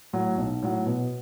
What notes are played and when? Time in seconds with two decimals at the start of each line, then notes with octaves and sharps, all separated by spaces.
0.13 A2 F#3
0.38 B1
0.62 A2 F#3
0.86 B2